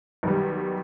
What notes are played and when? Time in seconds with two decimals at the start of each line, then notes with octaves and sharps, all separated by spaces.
0.23 B1 D#3 G3